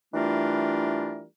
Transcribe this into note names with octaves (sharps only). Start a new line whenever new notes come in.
E3 G3 A3 D4 F4 A#4